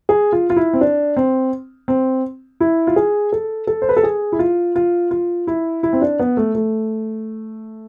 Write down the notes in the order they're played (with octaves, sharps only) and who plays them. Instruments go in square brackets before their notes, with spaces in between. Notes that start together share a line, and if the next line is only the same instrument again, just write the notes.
[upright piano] G#4
F4
F4
E4
C4
D4
C4
C4
E4
F4
G#4
A4
A4
C5
B4
A4
G#4
E4
F4
F4
F4
E4
E4
C4
D4
B3
A3
A3